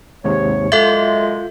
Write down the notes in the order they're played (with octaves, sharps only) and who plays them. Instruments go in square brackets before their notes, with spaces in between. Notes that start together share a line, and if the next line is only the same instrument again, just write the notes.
[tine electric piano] D#2 G#2 C3 [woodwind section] C#5
[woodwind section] F#2 G#3 [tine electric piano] F4 G6 [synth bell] A4 E5